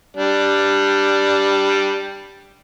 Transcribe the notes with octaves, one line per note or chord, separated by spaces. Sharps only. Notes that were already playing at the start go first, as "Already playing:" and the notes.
G3 D4